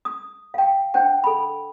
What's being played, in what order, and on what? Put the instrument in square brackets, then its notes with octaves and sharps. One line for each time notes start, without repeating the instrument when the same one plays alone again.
[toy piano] D#6
F5 G5
D4 C5 F#5 G5
A4 B5